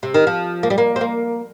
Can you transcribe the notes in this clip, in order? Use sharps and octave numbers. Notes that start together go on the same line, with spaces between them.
C3
D#3
F3
A#3
G3
A#3
C4
A#3